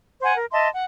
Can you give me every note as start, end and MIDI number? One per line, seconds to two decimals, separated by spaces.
0.22 0.34 72
0.22 0.34 78
0.22 0.34 80
0.36 0.45 70
0.52 0.68 75
0.52 0.68 76
0.52 0.68 81
0.52 0.68 84
0.73 0.84 78